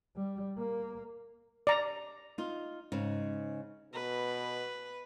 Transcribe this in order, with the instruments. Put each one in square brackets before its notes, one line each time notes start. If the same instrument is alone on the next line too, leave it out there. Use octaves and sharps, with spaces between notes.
[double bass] G3
A#3
[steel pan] D5 A#5
[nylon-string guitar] D#4 F4
G#2 C#3 D#4
[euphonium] B2 [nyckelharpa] B4